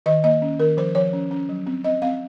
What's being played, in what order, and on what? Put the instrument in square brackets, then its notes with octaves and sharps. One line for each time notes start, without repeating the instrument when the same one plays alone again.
[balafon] D#3 D#5
A#3 D#5
C#4
D#3 A#4
F3 C5
F3 C#5
C#4
C#4
F#3
C4
C4 D#5
C4 F5